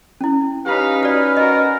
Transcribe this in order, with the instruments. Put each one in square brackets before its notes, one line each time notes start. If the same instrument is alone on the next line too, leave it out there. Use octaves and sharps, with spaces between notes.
[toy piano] C#4 E4
[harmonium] C#4 B4 [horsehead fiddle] D#4 B5 [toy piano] G4 [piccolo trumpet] F5
[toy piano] F#4 D5 [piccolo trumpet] F6
[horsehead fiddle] F#4 A#4 [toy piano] D#5